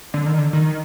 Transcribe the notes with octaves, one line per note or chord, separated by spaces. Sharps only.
D3
D#3
D3
D#3